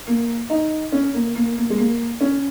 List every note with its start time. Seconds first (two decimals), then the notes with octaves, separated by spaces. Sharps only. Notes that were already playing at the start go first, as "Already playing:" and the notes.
0.07 A#3
0.50 D#4
0.92 C#4
1.14 A#3
1.36 A#3
1.57 A#3
1.70 G#3
1.78 A#3
2.21 C#4